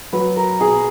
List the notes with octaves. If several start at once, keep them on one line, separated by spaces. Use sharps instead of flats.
F#3 B4
A#4
B2 G#4